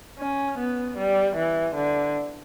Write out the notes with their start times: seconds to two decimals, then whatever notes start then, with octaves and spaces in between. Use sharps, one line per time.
0.18 C#4
0.58 B3
0.98 G3
1.36 E3
1.75 D3